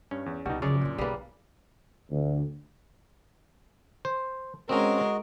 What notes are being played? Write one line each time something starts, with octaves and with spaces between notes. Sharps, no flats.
G2 C#4
E2
C2 B2 G3 B3 D#4 F#4
F#2 C#3 F3 G#4 C#5 D5
E2 G2 A#2
B1 G3 A#3 G#4 B4
D2
C5
G#3 C4 C#4 F#4 A#4 D#5